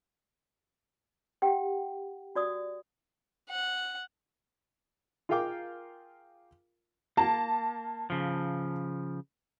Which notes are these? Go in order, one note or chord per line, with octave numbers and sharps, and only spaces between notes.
G4 F#5 G5
F#4 D5 D#6
F#5
F4 G#4 A#4 F5 G5 D6
A#3 A5
C#3 F3